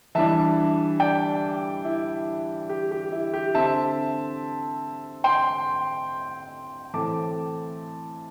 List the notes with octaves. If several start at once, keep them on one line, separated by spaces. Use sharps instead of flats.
E3 G3 D4 E5 A5
D5 G5
E4
G4
G4
E4
G4
D3 C4 E5 A5
G5 C6
A2 E3 A3 C4 A5 D6